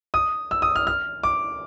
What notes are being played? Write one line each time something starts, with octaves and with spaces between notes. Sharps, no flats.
D#6
E6
D#6
F6
F6
D6